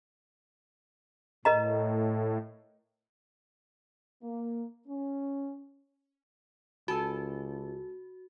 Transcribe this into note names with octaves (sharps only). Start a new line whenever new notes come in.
A2 A#4 D#5 A#5
A#3
C#4
C#2 F#4 A4 G#5 A5